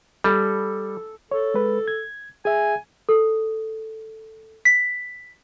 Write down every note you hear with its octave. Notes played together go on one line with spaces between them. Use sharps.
G3 A4
A4 C#5
G#3 B4
G#6
G#4 E5 G#5
A4
B6